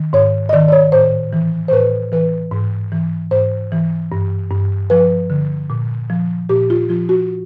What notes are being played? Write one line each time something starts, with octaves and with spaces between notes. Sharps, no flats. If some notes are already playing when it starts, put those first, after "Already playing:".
Already playing: D#3
G#2 C#5
D#5
D#3 D5
D5
C#5
A2 C5
E3
C5
A2 B4
E3 B4
G#2
E3
G#2 C5
E3
G2
G2
F3 B4
D3
A#2
F3
A#2 G4
F4
F3 F4
F#4